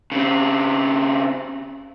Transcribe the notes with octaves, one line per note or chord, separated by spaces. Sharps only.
C#3 C4